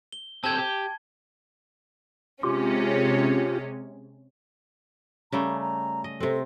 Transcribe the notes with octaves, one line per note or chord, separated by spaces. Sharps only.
G7
C4 G4 A4 A5 G#6
G4
C3 G#3 C#4 F4 G4
C#3 G3 A3 A#5
A#5
D#5
C3 C4 A4